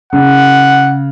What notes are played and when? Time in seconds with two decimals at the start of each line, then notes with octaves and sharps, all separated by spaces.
0.13 C#3 F#5